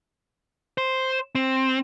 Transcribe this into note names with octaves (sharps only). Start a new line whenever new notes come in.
C5
C4